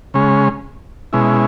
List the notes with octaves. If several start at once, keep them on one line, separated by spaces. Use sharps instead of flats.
C#3 G#3 C#4
B2 G#3 C#4 E4